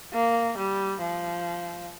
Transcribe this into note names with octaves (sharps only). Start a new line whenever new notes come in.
A#3
G3
F3